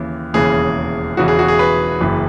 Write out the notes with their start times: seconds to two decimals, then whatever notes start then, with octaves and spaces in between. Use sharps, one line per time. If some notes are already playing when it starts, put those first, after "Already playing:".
Already playing: D#2 C#3 E3
0.34 E1 D#2 C#3 E3 G#4
1.17 E1 E2 C#3 E3 F#4
1.28 G#4
1.39 F#4
1.48 G#4
1.59 B4
2.01 F#1 F#2 E3